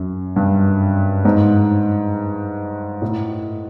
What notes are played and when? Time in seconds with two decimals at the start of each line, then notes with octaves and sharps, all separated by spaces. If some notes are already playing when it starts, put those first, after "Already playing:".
Already playing: F#2
0.36 G2
1.25 G#2
3.02 A2